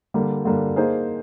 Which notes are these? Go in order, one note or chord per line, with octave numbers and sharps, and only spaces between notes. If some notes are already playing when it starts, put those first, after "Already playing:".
D3 G3 A#3
D3 G3 A#3
A#3 D#4 G#4 C5